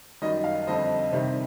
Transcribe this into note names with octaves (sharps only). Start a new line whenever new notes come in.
F#2 D#3 G3 D#5
F5
F2 D3 G3 C4 D#5
C3 D#3 G3 C4